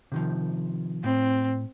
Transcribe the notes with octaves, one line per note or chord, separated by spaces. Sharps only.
C3 D#3 F3
A2 C4